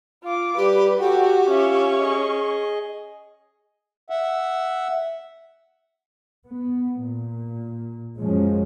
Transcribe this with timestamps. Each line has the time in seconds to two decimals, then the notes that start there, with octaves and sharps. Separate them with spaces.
0.24 F4 D6
0.57 G3 G4 B4
1.01 F#4 G4 A4 G5
1.50 C#4 F4 E5 C#6
2.00 G#4 D#5
4.10 E5 F#5
6.46 B3
7.02 A#2
8.17 F#2 F3 G#3 C#4